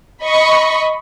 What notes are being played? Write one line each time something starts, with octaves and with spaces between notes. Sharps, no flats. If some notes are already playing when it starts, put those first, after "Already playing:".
D#5 B5 C#6